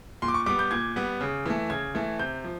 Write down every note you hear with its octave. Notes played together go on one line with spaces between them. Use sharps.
A#2 C6
D6
C#6
G3 B3 D6
G6
A#2 G#6
G3 B3
C#3
E3 A3
C#3 G#6
E3 A3
C3 G6
F3